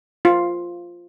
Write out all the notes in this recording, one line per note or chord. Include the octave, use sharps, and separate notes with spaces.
F4